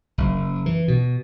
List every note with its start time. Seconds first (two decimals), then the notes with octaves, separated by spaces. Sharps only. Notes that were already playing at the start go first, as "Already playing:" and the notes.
0.18 F#1
0.66 E3
0.88 B2